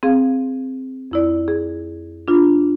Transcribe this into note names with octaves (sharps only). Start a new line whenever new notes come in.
C4 G#4 F5
F2 E4 D5
G#4
D4 F4